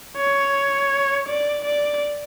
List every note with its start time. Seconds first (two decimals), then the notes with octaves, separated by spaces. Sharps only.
0.17 C#5
1.28 D5
1.64 D5